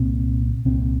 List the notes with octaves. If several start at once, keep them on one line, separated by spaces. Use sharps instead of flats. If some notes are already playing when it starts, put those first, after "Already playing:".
Already playing: C2 A#2 C4
C2 A#2 C4